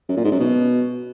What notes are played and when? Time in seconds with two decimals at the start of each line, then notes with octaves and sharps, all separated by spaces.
0.09 F#2
0.17 A#2
0.24 G#2
0.32 F#2
0.40 B2